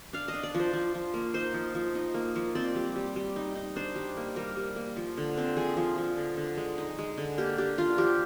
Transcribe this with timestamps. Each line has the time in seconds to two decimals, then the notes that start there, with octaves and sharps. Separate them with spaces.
0.13 D4 F5
0.28 D#5
0.34 D4
0.43 D5
0.54 F3
0.60 C5
0.73 F3
0.94 F3
1.14 A#3
1.34 D#4 C5
1.54 F3
1.75 F3
1.95 D#4
2.14 A#3
2.36 F3
2.55 C4 D5
2.75 G3
2.95 G3
3.16 G3
3.36 D#4
3.55 D#4
3.76 D4 C5
3.95 G3
4.17 A#3
4.36 G3 A#4
4.57 G3
4.76 A#3
4.96 F3
5.17 D3
5.38 C4
5.57 F3 G#4
5.77 F3
5.98 F3
6.17 D3
6.37 D3
6.57 G#3
6.78 D#4
6.99 G#3
7.17 D3
7.38 A#3 G4
7.58 D4 G4
7.78 D4 F4
7.98 F3 G4